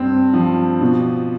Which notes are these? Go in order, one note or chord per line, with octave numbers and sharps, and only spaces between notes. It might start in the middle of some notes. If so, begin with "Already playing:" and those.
Already playing: G2 C4
F3
B2